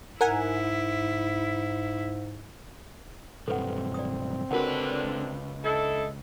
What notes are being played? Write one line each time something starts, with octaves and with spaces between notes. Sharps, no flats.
G#2 E4 A#4 F#5 G#5
B1 G2 C4 A4 B4 F#5
D5 D#6
C#2 D3 D4 F#4 A#4 B4 F#5
D4 E4 A4 D#5